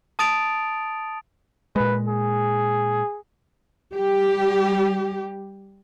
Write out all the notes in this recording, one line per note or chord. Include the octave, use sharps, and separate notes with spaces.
A5 D#6 A6 D7 F7
A#2 G#3 B4
G#4
G3 G4